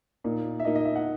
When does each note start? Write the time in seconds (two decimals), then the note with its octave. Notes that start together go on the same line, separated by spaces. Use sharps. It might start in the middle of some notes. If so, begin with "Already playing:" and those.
0.24 A#2 A#3 D#4
0.60 E5
0.65 A#2 A#3 D#4 D#5
0.75 D#5
0.85 E5
0.96 F#5